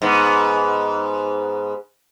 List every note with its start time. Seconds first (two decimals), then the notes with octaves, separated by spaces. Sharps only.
0.02 G#2 B3